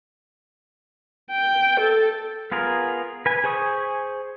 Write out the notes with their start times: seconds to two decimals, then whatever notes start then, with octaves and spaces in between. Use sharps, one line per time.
1.31 G5
1.80 A4
2.52 B3 F4 G#4 A#4
3.26 B4 G#5
3.44 G#4 C5 G#5 C#6 D#6